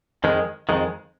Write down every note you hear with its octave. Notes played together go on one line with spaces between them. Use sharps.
F2 D#3 G#3
F2 D#3 G#3